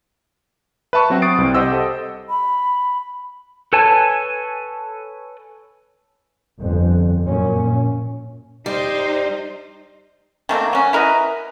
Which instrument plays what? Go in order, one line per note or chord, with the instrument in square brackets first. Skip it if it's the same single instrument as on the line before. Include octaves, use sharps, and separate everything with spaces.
[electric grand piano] B4 E5 A5 C#6
F#3 C4 F#4
C#6 D#6 A6 C7 D7
C2 C4
G4 C5 D#5 F#5 G5 E6
A4 D#5
[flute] B5
[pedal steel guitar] A4 B4 C#5 G#5 A5
[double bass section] G1 F2
F#2 A#2 C#4
[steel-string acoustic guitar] G3 [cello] D#4 C5
[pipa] D#3 A3 A#3 C4
F#3 C#4
E4 A#4 B4 D#5